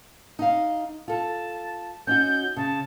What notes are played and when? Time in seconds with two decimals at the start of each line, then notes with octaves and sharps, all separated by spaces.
0.39 D#4 F5
1.08 F4 A4 A5
2.07 C#4 D#4 F#4 G6
2.57 C#3 A5